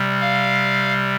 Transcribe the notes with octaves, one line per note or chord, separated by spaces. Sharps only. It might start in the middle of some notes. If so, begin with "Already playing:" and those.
Already playing: C3 G3
F5